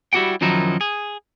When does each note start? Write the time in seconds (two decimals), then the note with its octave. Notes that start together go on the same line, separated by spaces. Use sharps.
0.13 G3 E4 F#4 G4 F#5 G5
0.41 F#2 D#3 F3 F#3 D#4 E4
0.81 G#4